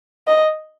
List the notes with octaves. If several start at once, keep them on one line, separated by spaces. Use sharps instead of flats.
D#5